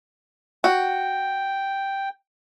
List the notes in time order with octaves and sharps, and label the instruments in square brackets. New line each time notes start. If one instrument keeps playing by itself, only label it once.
[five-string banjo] F#4 [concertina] G5